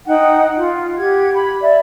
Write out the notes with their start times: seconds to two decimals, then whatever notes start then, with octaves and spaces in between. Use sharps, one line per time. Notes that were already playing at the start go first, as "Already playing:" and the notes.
0.06 D#4 F#5 G5
0.56 F4
0.98 G4 F#5 G#6
1.35 B5
1.61 D5 E5